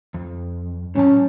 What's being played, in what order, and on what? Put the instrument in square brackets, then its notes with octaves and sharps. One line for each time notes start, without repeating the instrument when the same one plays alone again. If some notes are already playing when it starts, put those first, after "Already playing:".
[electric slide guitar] F2
[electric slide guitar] A2 F#3 A5 [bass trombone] C#4